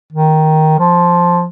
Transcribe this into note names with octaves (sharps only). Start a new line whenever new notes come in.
D#3
F3